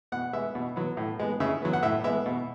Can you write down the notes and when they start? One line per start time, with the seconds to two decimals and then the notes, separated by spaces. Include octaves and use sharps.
0.12 B2 F#5
0.33 G#3 B3 E5
0.55 B2
0.76 F#3 B3
0.97 A2
1.20 G#3 B3
1.40 C#3 E5
1.62 F#3 B3
1.73 F#5
1.83 A2 E5
2.04 G#3 B3 E5
2.26 B2